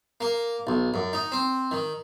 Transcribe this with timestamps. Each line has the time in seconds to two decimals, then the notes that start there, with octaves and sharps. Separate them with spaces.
0.21 A#3
0.67 B1
0.94 F#2
1.13 D#4
1.32 C4
1.71 D#3